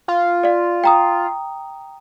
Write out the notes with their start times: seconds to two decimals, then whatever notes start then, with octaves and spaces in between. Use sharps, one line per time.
0.08 F4
0.43 D5 F5
0.84 G5 A#5 D#6